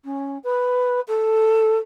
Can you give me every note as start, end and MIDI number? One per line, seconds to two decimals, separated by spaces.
0.05 0.38 61
0.44 1.00 71
1.07 1.78 69